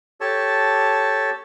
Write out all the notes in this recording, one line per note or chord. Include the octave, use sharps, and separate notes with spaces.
G4 A4 C#5 A5